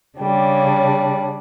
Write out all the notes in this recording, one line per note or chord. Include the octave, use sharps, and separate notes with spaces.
C#3 G3 D4